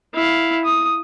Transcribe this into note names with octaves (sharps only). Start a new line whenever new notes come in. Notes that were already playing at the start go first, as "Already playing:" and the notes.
E4 F5
D#6